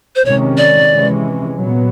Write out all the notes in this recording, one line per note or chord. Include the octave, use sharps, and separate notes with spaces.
C5
C3 D#3 G#3 C#4 C#5
D5
C3 E3 G#3 C#4
A#2 F#3 B3